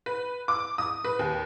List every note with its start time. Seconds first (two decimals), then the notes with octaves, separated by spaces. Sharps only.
0.06 B4
0.48 D6
0.78 D#6
1.04 B4
1.19 D#2